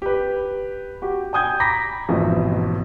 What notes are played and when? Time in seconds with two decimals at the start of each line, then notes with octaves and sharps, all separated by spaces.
0.02 G4 B4
1.02 F#4 G4
1.33 G5 G#5 D#6 G6 G#6
1.60 A#5 B5 D6 A#6 B6
2.08 A1 F2 G#2 B2